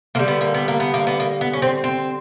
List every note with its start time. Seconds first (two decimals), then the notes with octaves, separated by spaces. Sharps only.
0.15 D3 G3 A#3
0.28 B3
0.41 A#3
0.54 B3
0.68 A#3
0.80 B3
0.94 A#3
1.07 B3
1.20 A#3
1.41 B3
1.54 C#4
1.62 C4
1.84 C4